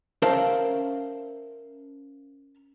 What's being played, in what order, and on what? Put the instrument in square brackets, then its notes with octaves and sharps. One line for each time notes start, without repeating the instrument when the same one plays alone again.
[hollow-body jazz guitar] C#4 A#4 C5 E5 F5 A5